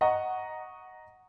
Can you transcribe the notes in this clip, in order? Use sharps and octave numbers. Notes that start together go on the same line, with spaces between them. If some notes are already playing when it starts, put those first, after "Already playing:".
D#5 F#5 A#5 C#6